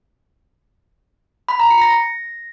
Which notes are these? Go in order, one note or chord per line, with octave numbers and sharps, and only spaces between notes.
B5
A#5
C#7
A#6